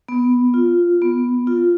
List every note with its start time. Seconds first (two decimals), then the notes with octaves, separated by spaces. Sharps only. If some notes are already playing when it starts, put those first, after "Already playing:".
0.09 B3
0.54 F4
1.02 B3
1.47 F4